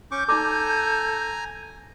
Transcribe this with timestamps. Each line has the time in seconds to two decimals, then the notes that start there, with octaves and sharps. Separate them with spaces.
0.11 C#4 C#6 D6 G6
0.29 D#4 A4 D5 G#5 A#5 D6